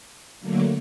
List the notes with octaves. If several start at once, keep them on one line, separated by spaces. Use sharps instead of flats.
D3 F#3 A3 A#3